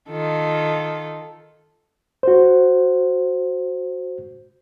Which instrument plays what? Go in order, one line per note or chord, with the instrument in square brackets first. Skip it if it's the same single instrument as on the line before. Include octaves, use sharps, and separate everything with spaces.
[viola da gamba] D#3 F4 A4
[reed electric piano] F#4 C5